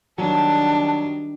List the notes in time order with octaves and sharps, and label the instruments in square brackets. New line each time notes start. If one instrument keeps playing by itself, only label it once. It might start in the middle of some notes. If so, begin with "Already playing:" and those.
[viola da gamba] D#3 G3 D4 [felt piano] F#3 [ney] A5